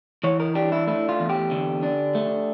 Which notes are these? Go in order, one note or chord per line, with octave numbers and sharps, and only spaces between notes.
E3 C#5
A#4
D4 G4
E4
A3 E4
F4
E2
G4
D3
D4
A3